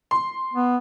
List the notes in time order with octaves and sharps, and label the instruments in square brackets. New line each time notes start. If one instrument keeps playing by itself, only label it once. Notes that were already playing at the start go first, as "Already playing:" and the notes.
[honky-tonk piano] C6
[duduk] B3